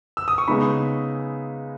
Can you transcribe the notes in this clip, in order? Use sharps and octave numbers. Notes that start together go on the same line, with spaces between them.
E6
D#6
C#6
C#3 G#3 B3 D#4 B5